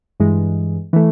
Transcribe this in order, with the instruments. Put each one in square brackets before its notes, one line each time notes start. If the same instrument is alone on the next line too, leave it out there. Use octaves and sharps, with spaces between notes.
[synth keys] G2 E3 G#3
E3 A3